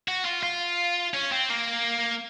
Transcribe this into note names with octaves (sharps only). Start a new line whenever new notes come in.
F#4
F4
F4
C#4
C4
A#3